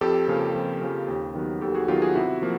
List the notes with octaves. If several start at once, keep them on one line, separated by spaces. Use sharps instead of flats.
F2 G4 A4
C#3 F3 A#3 C#4
F2
C#3 F3 A#3 C#4
D#2
D#3 F#3 B3
D#2 G4 A4
F#4 G#4
D#3 F#3 B3 F4 G4
F#4 G#4
C3 E4 F#4
F3 A#3